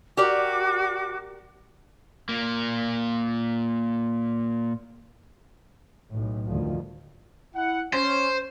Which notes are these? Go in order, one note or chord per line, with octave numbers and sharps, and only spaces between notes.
F#4 G4 A#4 D5 D6
A#2 A#3
B1 A2
D2 G2 D#3 F3
E4 F#5
C#4 C5